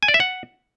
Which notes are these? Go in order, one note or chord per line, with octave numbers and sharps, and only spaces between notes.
G#5
D5
E5
F#5